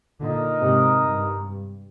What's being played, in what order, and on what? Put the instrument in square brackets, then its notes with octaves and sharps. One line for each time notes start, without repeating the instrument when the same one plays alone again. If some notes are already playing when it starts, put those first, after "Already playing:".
[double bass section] A#2 D3 [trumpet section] D#4 A#4 D#5
[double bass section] G#2 C3
G2